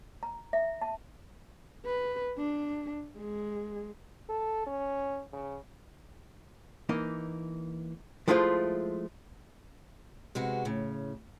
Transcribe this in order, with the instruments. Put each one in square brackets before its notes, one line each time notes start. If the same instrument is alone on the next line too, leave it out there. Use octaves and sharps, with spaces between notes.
[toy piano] A#5
E5
A5
[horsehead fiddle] B4
D4
G#3
[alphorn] A4
C#4
C#3
[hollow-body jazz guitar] E3 A#3 D#4
F3 G#3 A3 E4 F4 C5
[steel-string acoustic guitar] C3 G#3 B3 F#4
A2 C#3